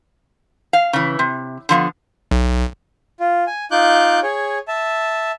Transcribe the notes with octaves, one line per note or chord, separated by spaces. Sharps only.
F5
C#3 E3
C3
D3 F3 A#3 B3
B1
F4
G#5
D#4 F4 D6 F#6 G6
G#4 C#5
E5 A5